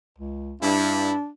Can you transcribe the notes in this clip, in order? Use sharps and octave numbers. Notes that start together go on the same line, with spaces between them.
C#2
G2 D4 E4